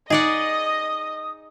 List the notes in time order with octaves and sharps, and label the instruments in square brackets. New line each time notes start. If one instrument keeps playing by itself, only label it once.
[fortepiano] D#4 [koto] G#4 D5 F#5 [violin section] D#5 [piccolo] D#6